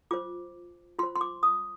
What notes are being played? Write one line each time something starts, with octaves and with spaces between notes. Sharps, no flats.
F4 C5 D6
F4 C5 C6
C6
D6
D#6